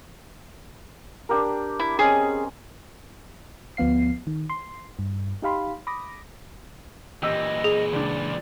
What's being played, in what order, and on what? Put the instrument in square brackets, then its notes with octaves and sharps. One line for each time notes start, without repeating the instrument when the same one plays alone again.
[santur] D4 G4 A#4
[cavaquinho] E4
[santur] C4 C#4 D#5 [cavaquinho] G#4
[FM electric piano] D2 F3 B3 F5 C7
D#3
C6
G2
D#4 G4 F5 B5 C6
B5 D6 D#6 A#6
[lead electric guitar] A#2 E3 [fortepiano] G4 E6 [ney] D#5
[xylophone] G#4
[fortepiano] C#2 D4 [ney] D5